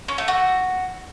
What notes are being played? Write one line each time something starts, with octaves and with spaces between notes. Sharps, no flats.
C#4
A3
F#4